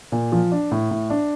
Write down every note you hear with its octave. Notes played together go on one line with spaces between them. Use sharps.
A#2
F3
D4
A2
A2
D4